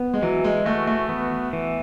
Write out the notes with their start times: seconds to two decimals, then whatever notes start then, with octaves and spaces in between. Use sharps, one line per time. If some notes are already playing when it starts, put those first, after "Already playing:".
Already playing: B3
0.14 G#3
0.22 E3 F#3
0.44 G#3
0.66 A3 F#4
0.87 A3
1.09 B3
1.53 E3